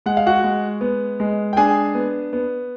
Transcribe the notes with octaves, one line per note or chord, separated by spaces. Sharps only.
G#3 F#5
F5
F#4 F#5
G#3
B3
G#3
G5
D4 G#4 G#5
B3
B3